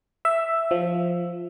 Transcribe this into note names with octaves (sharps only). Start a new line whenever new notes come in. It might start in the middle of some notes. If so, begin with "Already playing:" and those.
E5
F3